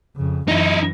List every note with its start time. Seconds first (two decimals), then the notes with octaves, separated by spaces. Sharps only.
0.16 F2 C#3
0.48 F#2 E3 D#4 E4